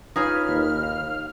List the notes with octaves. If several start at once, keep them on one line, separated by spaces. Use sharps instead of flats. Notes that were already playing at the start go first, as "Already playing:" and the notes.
D#4 F4 G#4 B4 C#5 F6
D#2
F5